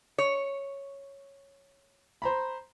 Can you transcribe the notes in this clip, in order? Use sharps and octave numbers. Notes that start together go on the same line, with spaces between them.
C#5
C5 A#5 B5